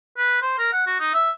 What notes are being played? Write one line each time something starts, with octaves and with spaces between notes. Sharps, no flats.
B4
C5
A#4
F#5
F#4
D#4
E5